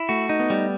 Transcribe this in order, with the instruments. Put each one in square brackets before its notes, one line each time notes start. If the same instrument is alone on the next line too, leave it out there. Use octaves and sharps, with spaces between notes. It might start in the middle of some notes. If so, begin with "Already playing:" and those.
Already playing: [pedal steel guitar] E4
[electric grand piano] A3 [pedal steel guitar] F#4
[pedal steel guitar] D#4
[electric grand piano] B3
[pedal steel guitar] G3